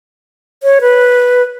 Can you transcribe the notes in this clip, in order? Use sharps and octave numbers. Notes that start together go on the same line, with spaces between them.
C#5
B4